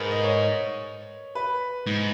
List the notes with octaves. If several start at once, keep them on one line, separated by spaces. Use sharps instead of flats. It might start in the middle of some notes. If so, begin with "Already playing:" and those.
Already playing: G#2 A#4 B4
D#5
C#5
B4
G#2